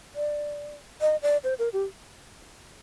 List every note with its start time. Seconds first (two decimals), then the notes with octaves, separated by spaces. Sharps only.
0.15 D5
1.01 D#5
1.22 D5
1.44 C5
1.59 A#4
1.73 G4